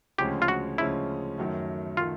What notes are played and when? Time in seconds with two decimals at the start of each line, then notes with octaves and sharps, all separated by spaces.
0.18 D2 C#3 F3 G#3 C#4 G4
0.42 F4
0.48 F#4
0.78 D2 C#3 F3 G#3 C#4 E4
1.38 F#2 D#3 F#3 A3
1.97 D#3 F#3 A3 F4